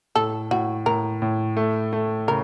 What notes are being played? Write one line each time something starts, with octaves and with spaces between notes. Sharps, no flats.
A2 A4
A2 F#4
A2 A#4
A2
A3
A3
C#3 A#4